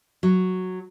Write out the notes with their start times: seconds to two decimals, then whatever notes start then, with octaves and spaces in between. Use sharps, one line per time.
0.23 F#3